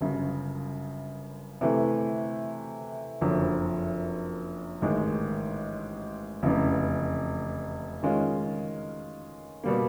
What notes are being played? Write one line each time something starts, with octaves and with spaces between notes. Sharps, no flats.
G1 F#2 C#3
C3 E3 A3
F#1 F2 D3 F#3
A1 G#2 D#3 G#3
F1 E2 C#3
D#3 G#3 C#4 F4
B2 G3 A#3